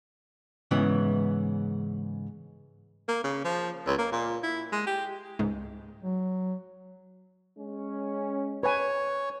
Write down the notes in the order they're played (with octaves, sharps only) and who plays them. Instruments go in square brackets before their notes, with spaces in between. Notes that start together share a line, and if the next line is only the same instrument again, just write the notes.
[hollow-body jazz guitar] G#2 C#3 E3 B3
[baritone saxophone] A#3
C#3
F3
C#2
A#3
A#2
E4
G#3
G4
[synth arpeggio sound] C#2 G#2 G#3
[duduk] F#3
[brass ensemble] G#3 C#4
[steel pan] B4 G#5 [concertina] C#5